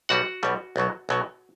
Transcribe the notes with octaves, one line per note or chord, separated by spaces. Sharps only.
B1 B2 G3 F#4 F#5
B1 B2 G3
B1 B2 F#3
B1 B2 F#3